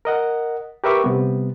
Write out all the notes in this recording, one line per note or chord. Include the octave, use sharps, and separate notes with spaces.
A#4 D#5 F#5
G4 A#4 B4 E5 C#6 D6
C3 G3 B3